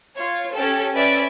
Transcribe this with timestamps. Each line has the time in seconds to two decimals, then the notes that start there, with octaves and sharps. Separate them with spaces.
0.15 F4 C#5
0.53 C#4 G4 A4
0.95 C#4 B4 D5 E5 D7